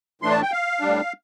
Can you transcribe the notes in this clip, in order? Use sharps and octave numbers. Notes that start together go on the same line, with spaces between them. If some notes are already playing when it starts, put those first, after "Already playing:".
A2 E3 A3 D4 C6
A5
G5
F5
A2 G3 D4